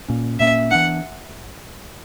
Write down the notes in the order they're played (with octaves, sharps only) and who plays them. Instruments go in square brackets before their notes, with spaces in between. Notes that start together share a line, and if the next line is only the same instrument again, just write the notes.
[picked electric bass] A#2 A#3 C#4
[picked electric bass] A#2 A#3 C#4 [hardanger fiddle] E5
[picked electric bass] E3 B3 D4 [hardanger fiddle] F#5